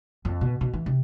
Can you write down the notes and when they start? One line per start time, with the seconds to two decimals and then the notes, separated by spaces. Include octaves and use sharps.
0.25 F2
0.41 B2
0.61 B2
0.73 E3
0.86 C3